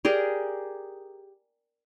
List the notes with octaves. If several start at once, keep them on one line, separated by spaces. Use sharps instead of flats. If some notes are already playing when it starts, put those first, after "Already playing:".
G4 G#4 A#4 D5